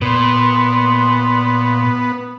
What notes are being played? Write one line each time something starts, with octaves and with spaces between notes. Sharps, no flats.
A#2 B3 C6